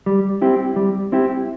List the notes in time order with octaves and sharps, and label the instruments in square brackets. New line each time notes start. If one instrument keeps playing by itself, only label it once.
[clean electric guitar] G3
C4 E4 G4
G3
C4 E4 G4